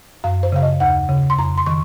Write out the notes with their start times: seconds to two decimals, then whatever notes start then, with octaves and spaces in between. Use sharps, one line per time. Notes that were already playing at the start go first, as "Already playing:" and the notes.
0.24 F#2 F5
0.43 C5
0.52 C#3 F5
0.62 D#5
0.80 D#2 F#5
1.09 C#3
1.30 C6
1.39 F2 A#5
1.58 C6
1.66 D#3 C#6